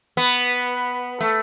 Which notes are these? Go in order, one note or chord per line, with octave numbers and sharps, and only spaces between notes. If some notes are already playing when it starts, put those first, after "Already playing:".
B3
A3